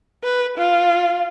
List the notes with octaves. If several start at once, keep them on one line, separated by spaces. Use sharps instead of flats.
B4
F4